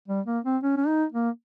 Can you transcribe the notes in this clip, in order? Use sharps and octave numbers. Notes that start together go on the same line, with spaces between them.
G3
A#3
C4
C#4
C#4
D#4
A#3